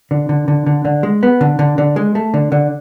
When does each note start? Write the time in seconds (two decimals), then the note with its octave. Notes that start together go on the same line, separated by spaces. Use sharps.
0.11 D3
0.29 D3
0.48 D3
0.66 D3
0.85 D3
1.03 G#3
1.23 B3
1.41 D3
1.59 D3
1.78 D3
1.96 G#3
2.15 A3
2.34 D3
2.52 D3